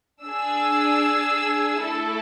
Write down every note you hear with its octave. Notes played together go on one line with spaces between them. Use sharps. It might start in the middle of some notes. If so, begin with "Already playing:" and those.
D4 G#4 E6
A3 E4 A4